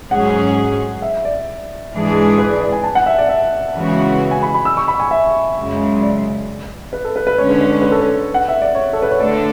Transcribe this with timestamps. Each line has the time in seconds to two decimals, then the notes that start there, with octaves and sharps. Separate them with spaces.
0.11 G#2 F#3 C#4 G#4 F#5
1.02 E5
1.25 D5
1.93 G#2 E3 G#3 D4 G#4
2.38 B4
2.50 D5
2.61 D5
2.72 G#5
2.84 A5
2.95 F#5
3.06 E5
3.18 D5
3.29 E5
3.75 C#3 E3 G#3 B3 F#4
4.31 G#5
4.43 B5
4.54 B5
4.65 E6
4.77 C#6
4.88 B5
5.00 G#5
5.11 E5
5.57 F#2 C#3 G#3
6.02 D5
6.93 B4
7.04 A4
7.16 B4
7.27 B4
7.38 D3 G#3 C#4 C#5
7.49 B4
7.61 B4
7.72 C#5
7.82 B4
7.92 A4
8.01 B4
8.34 F#5
8.48 E5
8.62 D5
8.75 C#5
8.93 A4
9.02 B4
9.11 C#5
9.20 D3 A3 D4 A4 D5